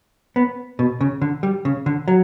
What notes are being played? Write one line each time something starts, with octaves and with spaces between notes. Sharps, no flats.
B3
B2
C#3
D3
G3
C#3
D3
F#3